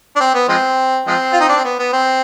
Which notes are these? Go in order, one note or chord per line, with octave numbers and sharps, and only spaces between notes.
D4
C4
B3
F3 G#3 C4
F3 G#3 C4
F4
D#4
D4
C4
B3
B3
C4